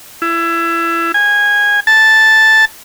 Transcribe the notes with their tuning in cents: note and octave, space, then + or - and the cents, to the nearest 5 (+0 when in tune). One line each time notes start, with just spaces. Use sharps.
E4 +25
G#5 -15
A5 +0